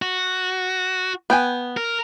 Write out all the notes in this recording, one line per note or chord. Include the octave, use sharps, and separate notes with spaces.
F#4
B3 G5 G#5
A#4